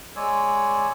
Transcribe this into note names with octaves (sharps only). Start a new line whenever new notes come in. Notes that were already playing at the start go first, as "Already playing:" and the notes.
G#3 C#5 D5 G#5 E6